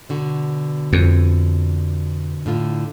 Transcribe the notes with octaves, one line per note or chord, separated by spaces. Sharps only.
B2 D3 F#4
F2
A2 D3 F4